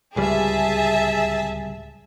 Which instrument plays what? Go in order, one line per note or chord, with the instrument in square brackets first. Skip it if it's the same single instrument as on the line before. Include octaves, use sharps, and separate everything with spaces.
[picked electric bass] D1 C#2 G3 [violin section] G#4 E5 A5